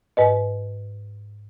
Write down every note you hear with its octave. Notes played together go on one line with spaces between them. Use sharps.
G#2 B4 D#5